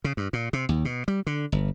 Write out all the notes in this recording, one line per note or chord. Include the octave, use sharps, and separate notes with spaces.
C#3
G2
A#2
C3
D#2
B2
G3
D3
G1